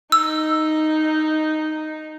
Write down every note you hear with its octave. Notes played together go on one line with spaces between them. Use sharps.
D#4 E6